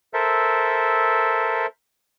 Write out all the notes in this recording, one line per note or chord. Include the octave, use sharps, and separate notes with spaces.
A4 A#4 C5 E5